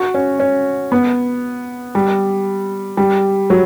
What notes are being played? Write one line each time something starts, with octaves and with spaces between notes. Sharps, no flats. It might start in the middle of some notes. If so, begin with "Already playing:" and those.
Already playing: F#4
C#4
C#4
B3
G3
G3
F#3